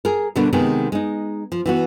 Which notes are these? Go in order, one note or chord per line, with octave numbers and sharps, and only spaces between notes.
G#4 A#4
B2 D3 G3 B3 D4 A#4
C3 D#3 G#3 B3 G#4
G#3 D#4
F3
E3 B3 F#4